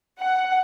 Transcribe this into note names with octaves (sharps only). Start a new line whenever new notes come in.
F#5